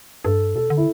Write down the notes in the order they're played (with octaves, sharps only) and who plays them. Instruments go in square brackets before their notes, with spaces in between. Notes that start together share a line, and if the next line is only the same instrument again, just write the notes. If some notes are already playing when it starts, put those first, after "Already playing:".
[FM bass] G2 [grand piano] A4
[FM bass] B2 [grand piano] A4
[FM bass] D3
[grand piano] E4